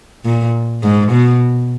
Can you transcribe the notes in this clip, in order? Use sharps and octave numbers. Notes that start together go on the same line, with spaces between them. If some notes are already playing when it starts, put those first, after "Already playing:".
A#2
G#2
B2